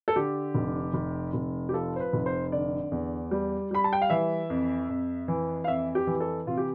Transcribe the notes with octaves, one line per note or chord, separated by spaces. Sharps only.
A4
D3 G4
F1
F1
F1
G4
F3 A4
C5
B4
F1
C5
D3 D5
E2
G3
G3 B5
A5
G5
F5
E3 E5
F2
F2
E3
F5
F2 E5
G4
E3
A4
C3 F4
G4